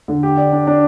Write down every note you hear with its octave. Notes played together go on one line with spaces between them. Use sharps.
D3
G4
D5
D4
D4